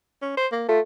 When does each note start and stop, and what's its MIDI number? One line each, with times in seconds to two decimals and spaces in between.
0.22 0.35 61
0.37 0.47 72
0.52 0.67 58
0.69 0.80 57
0.69 0.80 65